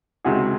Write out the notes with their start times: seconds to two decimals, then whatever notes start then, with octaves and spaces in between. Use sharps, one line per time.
0.24 C#2 C3 D#3 F#4 G#4